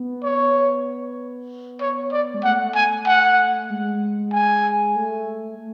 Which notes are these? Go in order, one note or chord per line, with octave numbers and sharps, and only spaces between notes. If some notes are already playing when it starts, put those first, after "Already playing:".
Already playing: B3
C#5
C#5
D5
G#3
A3 F#5
G#5
F#5
G#3
G#5
A3
A3